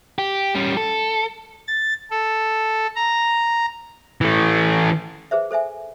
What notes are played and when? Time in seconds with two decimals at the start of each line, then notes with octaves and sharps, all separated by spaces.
0.19 G4
0.55 G3 C#4
0.77 A4
1.67 A6
2.11 A4
2.96 A#5
4.21 E3 A3
5.31 G#4 B4 C5 E5
5.51 A4 C5 E5 G#5